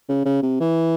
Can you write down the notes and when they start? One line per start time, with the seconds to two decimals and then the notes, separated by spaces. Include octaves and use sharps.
0.09 C#3
0.25 C#3
0.43 C3
0.60 E3